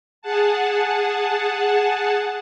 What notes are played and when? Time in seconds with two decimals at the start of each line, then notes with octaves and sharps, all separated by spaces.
0.22 G#4 F#5 A5